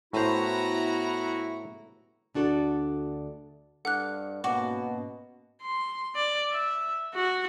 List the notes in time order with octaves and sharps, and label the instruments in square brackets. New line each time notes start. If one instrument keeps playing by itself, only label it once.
[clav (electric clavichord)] A2 C5 [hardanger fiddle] B3 A#5 [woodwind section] E4 F#4
[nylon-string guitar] D2 D4 F#4 A4
[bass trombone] G2 [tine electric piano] A4 F6 [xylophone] F#5 D6 F#6
[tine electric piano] G#2 A#3 C#4 [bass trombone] B2 [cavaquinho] F#4 [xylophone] D6
[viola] C6
D5
E5
F#4